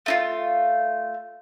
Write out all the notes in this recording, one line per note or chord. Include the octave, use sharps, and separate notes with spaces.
A3 D#4 F4